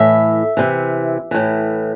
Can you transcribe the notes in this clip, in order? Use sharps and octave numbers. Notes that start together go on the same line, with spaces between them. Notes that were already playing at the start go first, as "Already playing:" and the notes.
Already playing: A2 E3 E5
C3 E3
A2 E3